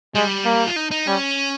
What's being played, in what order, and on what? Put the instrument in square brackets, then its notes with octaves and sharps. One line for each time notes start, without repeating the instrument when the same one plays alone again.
[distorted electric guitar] G3 [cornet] G#3
[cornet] A#3
[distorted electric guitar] F4
D#4
D#4
[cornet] G3 [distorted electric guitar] C#4